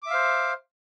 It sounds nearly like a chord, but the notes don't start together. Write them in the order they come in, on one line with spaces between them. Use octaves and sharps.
D6 E5 F5 C5